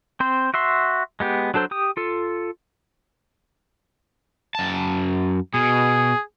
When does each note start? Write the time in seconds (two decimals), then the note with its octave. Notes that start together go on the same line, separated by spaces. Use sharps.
0.20 C4 C5
0.54 F#4 E5 C6
1.20 G#3 B3 G4
1.54 F#3 D4 A4 C5
1.71 G4 D#6
1.97 F4 A4
4.55 F#2 A5
5.54 B2 G#4